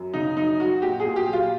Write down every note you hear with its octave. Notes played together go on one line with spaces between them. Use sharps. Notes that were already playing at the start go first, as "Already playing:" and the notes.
Already playing: F#2
C#3 D#4
F#2 D#4
F#3 F#4
A#2 G4
G#4
A#2
G4
F#3
F4